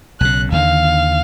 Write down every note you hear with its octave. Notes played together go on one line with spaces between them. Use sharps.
B1 C#3 F#6
D#2 D3 D#3 F5